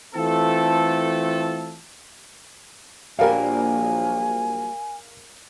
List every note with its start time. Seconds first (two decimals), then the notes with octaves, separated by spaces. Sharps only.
0.15 E3 A3 C4 F4 A4
3.19 A#1 F#3 G3 A#3 A#4 F5 G#5